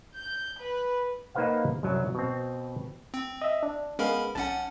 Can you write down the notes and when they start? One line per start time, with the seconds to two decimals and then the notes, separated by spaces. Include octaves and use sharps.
0.16 G6
0.59 B4
1.35 A#3 D#4 B4 C5 F5 F#5
1.83 C2 F#2 F#3
2.15 B2 C4
3.14 C4
3.41 D#5 E5
3.63 D4
3.99 G#3 B3 C#4 A#4 F5 B5
4.35 B1 C#4 F#5 A5